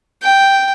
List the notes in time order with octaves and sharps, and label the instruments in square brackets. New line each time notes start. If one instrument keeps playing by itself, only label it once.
[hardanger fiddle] G5